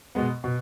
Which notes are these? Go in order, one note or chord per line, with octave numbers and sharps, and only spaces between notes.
B2 G#3 B3
B2